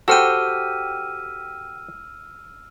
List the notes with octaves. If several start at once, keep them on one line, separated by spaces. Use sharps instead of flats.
F#4 G4 A4 C5 G5 E6 F6 D#7